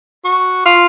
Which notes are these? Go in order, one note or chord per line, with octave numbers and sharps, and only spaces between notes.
F#4
F4